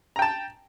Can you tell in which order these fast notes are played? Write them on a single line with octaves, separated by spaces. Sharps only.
A#5 G5 A5